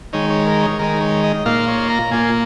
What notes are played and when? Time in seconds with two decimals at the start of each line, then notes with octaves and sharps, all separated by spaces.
0.13 D#3 G#3 D#4 C#5
0.30 C#5
0.47 A#4
0.63 C#5
0.79 D#3 G#3 D#4 A#4
1.01 C#5
1.24 D#5
1.45 A#2 A#3 F4 F5
1.68 C#5
1.90 A#5
2.11 A#2 A#3 F4 G#5